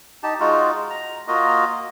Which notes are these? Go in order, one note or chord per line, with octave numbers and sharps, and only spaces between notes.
D#4 G4 A5
G#3 D#4 F4 F#4
A#5
A#3 F4 F#4 D#5